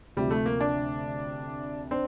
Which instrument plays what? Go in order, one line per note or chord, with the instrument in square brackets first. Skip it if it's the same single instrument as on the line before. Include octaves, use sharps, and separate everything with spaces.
[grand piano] D2 C3 F3 [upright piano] G3
[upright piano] A3
A#3
D4
[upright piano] C4 [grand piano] D4